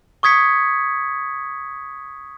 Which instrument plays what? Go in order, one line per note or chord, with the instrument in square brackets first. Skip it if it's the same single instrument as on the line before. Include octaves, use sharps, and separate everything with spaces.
[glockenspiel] C#6 D#6 G#6 B6 C#7